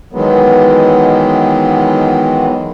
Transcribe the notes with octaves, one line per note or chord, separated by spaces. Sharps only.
D#3 E3 F#3 G#3 B3